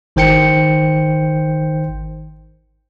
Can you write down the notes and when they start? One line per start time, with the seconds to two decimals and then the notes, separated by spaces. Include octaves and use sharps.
0.16 G#1 D#3 C5 G5 G6 C#7